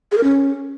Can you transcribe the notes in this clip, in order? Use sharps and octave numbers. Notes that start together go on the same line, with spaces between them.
G#4
A#4
C#4